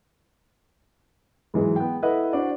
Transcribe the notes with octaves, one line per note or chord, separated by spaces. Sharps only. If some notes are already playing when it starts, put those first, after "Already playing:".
G#2 E3 F#3 G#3
B3 G5
E4 A4 B4 D#5 E5 F#5
D4 F#4 C5 D5